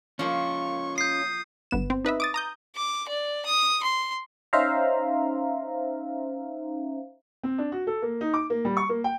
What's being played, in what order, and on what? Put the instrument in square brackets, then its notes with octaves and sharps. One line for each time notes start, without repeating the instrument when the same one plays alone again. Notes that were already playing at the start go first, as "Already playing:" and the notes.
[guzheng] F3 A#3 [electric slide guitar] C#4 F4 [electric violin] C#6
[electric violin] D#6 [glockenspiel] G6 C7
[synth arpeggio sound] G1 B3 E7
C4
D#4 B4 D#5 E5
D6 D#6 A6
A#5 D#6 G6
[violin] D6
D5
D#6
C6
[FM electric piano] C#4 D#4 C5 E5 F5 A#5
[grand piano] C4
D4
F#4
A4
A#3
D#4
D6
A#3
G3
C#6
A#3
G5